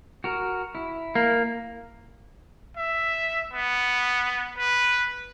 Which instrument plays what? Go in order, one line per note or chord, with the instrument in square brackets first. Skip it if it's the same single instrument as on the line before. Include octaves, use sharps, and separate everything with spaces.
[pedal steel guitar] F#4 A#4
E4
[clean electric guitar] A#3
[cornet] E5
B3
B4